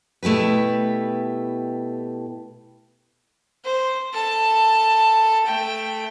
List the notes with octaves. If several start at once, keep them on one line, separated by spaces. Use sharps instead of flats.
B2 A3 E4 G4 B4
C5
A4 A5
A3 G5